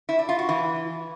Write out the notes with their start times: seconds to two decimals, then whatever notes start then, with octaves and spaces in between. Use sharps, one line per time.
0.09 E4
0.19 D4
0.29 F4
0.39 F#4
0.49 E3